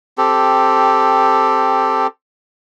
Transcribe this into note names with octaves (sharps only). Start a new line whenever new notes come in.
C4 G4 A4